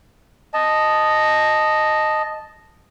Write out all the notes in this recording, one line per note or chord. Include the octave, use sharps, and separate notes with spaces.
D#5 A5